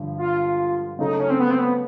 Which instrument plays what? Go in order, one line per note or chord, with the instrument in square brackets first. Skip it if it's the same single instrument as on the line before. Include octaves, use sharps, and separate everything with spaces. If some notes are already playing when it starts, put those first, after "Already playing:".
Already playing: [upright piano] G2 D3 F3
[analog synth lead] F4
[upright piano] C#3 F#3 A3 [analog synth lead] D#4
[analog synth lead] C#4
C4
B3
C4
B3